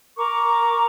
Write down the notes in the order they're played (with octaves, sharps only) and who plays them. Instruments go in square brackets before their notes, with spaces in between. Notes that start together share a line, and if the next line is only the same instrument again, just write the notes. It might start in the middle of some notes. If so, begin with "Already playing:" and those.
[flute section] A#4 A#5 C#6 D6